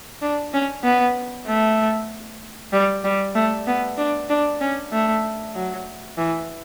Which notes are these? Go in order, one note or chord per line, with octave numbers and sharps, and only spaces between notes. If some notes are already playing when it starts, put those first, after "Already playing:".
D4
C#4
B3
A3
G3
G3
A3
B3
D4
D4
C#4
A3
F#3
E3